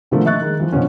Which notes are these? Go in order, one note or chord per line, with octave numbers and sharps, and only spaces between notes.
B2 D3 D#3 F3 A3 A#3
D#5 E5 C#6 F#6 A6
D#3 G#3
E3 F3
B2 D3 F3 C#4